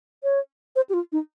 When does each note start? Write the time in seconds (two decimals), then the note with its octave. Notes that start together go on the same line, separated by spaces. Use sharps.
0.23 C#5
0.76 C5
0.90 G4
0.94 F4
1.12 D#4